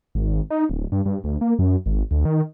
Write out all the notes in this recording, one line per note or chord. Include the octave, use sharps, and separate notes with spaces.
G#1
D#4
D1
G2
G2
D2
A#3
F#2
G#1
D2
D#3